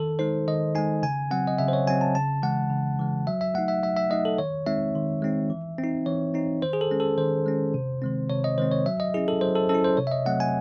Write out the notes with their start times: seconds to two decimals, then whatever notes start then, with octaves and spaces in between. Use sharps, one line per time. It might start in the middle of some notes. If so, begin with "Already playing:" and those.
Already playing: D#3 A4
0.19 G#3 D#4 C5
0.47 D#3 D#5
0.75 G#3 D#4 G#5
1.03 C#3 G#5
1.31 F#3 C4 F#5
1.47 D#5
1.59 C#3 E5
1.68 C5
1.73 C#5
1.87 F#3 C4 G#5
2.01 A5
2.15 C#3 A5
2.42 E3 G#3 F#5
2.70 C#3
2.99 E3 G#3
3.27 F#3 E5
3.41 E5
3.54 A3 D#4 F#5
3.68 E5
3.83 F#3 E5
3.97 E5
4.10 A3 D#4 D#5
4.25 A4
4.38 D#3 C#5
4.66 G#3 C4 D#4 E5
4.95 D#3
5.22 G#3 C4 D#4
5.50 E3
5.78 C4
5.83 D#4
6.06 E3 C#5
6.34 C4 D#4
6.62 D#3 C5
6.73 G#4
6.81 A4
6.91 G#3 C#4
7.00 A4
7.18 D#3 C5
7.46 G#3 C#4
7.74 C3
8.02 D#3 G#3 C4
8.30 C3 C#5
8.44 D#5
8.58 D#3 G#3 C4 C5
8.72 C#5
8.86 F#3 E5
9.00 D#5
9.14 C#4 E4 G#4
9.28 A4
9.41 F#3 C5
9.55 A4
9.69 C#4 A4
9.74 E4
9.84 C5
9.97 C3 C#5
10.07 E5
10.11 D#5
10.26 F#3 A3 C4 F#5
10.40 G#5